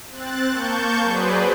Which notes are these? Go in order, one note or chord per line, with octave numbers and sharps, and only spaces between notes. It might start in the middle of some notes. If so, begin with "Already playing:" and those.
C4 F#6 A6
A#3 A5 C#6 G6
F#3 G#4 B4 C5 D5